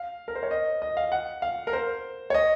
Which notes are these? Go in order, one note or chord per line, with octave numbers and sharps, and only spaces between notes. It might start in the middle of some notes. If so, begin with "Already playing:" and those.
Already playing: F5
A#4
C5
C#5
D#5
D#5
F5
F#5
F5
A#4
C5
C#5
D#5